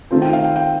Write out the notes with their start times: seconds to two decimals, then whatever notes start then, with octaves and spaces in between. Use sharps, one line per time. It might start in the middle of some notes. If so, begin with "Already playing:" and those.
0.11 D#3 A3 C4 F4 C5
0.22 G5
0.33 F5
0.44 G5
0.56 G5